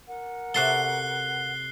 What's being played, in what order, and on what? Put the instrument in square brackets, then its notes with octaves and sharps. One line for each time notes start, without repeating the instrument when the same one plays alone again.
[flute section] A#4 F#5
[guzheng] C3 F#4 A4 [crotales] F#6 C7 G7